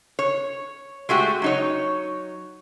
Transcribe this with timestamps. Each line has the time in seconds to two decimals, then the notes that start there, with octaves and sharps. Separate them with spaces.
0.19 C#5
1.09 G#3 A3 F#4 G4
1.42 F#3 D#4 C#5